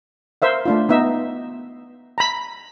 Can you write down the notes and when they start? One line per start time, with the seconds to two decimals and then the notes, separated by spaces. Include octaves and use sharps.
0.42 A#4 C5 E5 F5
0.66 A3 D4 F4
0.89 B3 D#4 E5
2.18 A#5 B5